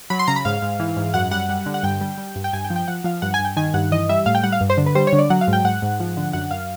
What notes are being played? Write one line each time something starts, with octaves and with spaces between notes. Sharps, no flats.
F#3 B5
C6
C#3 A#5
B5
G#2 F5
G#2
E3
G#2
F#2 F#5
G3 F#5
G3
D3
F#5
G2 G5
G3
G3
G2
G5
G2 G#5
G5
F3
G5
F3 F#5
F3 F5
G2 F#5
G#5
G2
G5
D#3 G#5
G2 F#5
E3 D#5
G3 E5
A2 F5
G5
G3 F#5
F5
G2
C5
D3
B4
G3 C5
C#5
D3
D5
F#3 F#5
F5
G#2
G5
G#2 F#5
G#2
F3
D3
F#2 F#5
F#2 F5